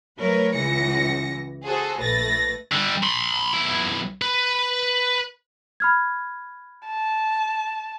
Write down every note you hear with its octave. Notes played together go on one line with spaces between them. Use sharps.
F#3 A3 A#4 B4 C#5
C#2 C#3 E3 A#6 C#7
F#4 G#4 A4 C5
A#1 A3 B4 A6 A#6
D3 G3
B5 C6
B1 E4
B4
B5 F6 G#6
A5